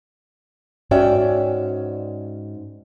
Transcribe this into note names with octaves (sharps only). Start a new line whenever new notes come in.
G#2 C#4 F#4 D5 E5 G5